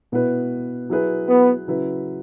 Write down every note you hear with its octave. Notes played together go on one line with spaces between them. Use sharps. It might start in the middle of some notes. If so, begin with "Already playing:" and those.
B2 B3 E4 B4
F#3 E4 G#4 B4
B3
C#3 F#3 E4 B4